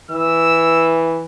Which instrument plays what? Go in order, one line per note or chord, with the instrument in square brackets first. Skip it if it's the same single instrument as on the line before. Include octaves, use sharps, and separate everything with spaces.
[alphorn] E3 [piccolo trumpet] E6